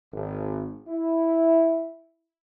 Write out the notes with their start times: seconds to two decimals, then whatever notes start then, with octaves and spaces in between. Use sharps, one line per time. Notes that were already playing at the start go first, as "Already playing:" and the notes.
0.13 G#1
0.87 E4